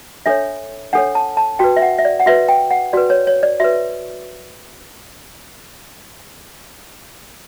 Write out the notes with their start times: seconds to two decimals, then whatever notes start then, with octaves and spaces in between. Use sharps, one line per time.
0.26 D4 A4 C#5 E5
0.93 D4 A4 C#5 F#5
1.15 A5
1.37 A5
1.59 F#4 B4 G5
1.76 E5
1.82 F#5
1.98 E5
2.05 D5
2.20 F#5
2.26 F#4 B4 E5
2.49 G5
2.71 F#5
2.93 F#4 B4 D5
3.10 C#5
3.27 C#5
3.43 D5
3.60 F#4 B4 E5